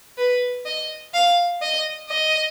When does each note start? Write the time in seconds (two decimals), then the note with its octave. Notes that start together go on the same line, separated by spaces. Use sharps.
0.18 B4
0.66 D#5
1.14 F5
1.62 D#5
2.09 D#5